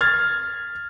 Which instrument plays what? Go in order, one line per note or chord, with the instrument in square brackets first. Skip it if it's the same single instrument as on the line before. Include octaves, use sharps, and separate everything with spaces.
[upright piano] F6 G#6 A6